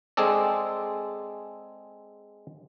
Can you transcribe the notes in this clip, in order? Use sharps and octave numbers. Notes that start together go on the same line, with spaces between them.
G#3 C4 G#4 A4 D5